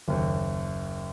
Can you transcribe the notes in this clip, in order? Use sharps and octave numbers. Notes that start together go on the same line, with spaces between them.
F#1 D#2